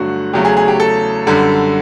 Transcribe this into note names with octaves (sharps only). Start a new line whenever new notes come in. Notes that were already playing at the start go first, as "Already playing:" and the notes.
Already playing: G2 D3 F#3 A3 F#4
E2 C#3 F#3 A3 G4
G#4
G#4
G4
A4
F#2 D3 G3